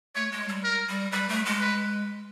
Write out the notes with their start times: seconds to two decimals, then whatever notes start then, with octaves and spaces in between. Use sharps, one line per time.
0.15 A3 C#5
0.32 G#3
0.48 G3
0.64 A#4
0.89 G3
1.12 G3 B4
1.29 A3
1.45 G#3
1.61 B4